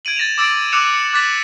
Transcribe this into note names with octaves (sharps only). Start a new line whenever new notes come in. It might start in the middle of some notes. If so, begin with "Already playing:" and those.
G#6 D7 D#7 F#7
A6 A#6 E7 F7
D6 E6 A6 D7
D6 E6 F#6 C#7 E7 F7
C#7
D6 F#6 A6 B6 E7